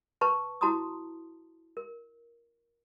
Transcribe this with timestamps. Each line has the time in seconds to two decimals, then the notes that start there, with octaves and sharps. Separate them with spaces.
0.21 B4 A5 C#6
0.61 E4 F#4 A5 A#5 C6 D#6
1.77 A#4